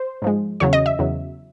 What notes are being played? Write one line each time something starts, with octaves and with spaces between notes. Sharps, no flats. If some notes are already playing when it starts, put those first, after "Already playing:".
Already playing: C5
G#2 F3 G#3
E2 C#3 F#3 C#5
D#5
E5
E2 C#3 F#3